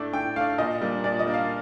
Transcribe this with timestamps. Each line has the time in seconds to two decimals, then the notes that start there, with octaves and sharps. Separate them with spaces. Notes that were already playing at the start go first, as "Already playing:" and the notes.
Already playing: A2 A3 D4
0.13 A2 G5
0.36 A3 D4 F5
0.58 A#2 D#5
0.81 G3 A#3 D4
1.04 A#2 D5
1.19 D#5
1.26 G3 A#3 D4
1.34 F5